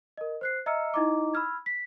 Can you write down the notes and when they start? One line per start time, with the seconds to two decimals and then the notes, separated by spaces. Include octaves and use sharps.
0.17 A#4 D#5
0.41 C5 F#6 C7
0.66 D#5 E5 A#5 E6 F6 C#7
0.94 D#4 E4 D#5 A#5 D6
1.34 B5 E6 F6 G#6
1.66 B6